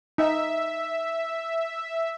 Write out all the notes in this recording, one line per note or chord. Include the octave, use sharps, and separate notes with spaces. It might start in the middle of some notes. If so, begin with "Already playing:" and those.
D#4 E5